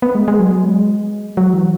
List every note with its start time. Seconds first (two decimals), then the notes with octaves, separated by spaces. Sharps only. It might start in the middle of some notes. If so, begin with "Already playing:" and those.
0.02 B3
0.15 G#3
0.28 G#3
0.39 F#3
0.64 G#3
1.37 F#3
1.53 E3